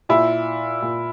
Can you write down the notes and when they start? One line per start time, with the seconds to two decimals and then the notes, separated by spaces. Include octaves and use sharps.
0.09 A#2 E4
0.82 A#2